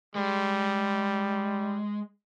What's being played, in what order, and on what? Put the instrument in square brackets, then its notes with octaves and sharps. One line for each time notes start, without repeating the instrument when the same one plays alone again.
[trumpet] G3 [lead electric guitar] G#3